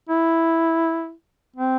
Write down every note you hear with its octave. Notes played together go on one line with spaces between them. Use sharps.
E4
C4